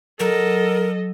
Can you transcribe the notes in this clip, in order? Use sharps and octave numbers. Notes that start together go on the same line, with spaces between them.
F#3 A4 A#4 D#5